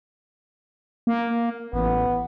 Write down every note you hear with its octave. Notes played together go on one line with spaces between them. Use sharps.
A#3
A1 B3